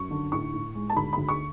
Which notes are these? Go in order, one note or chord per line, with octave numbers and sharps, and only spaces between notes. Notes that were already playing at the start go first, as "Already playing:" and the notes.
Already playing: F#2 C#6
D3
A2 C#6
A2
G#3
A5
D2 B5
D2 B5
C#6